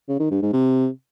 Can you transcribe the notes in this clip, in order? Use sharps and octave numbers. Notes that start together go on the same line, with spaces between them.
C#3
D#3
G2
G#2
C3